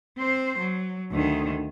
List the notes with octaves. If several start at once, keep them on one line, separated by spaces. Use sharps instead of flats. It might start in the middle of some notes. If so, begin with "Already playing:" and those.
C4 C5
F#3
D2 D#3